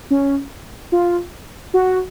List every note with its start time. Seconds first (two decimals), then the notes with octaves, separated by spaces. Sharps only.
0.11 C#4
0.92 F4
1.74 F#4